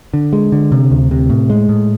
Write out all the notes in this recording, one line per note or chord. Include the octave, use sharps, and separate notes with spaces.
D3
G#3
D3
C3
D2
C3
A2
G#3
A2